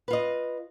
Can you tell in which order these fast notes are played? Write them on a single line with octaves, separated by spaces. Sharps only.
B4 F4 D#5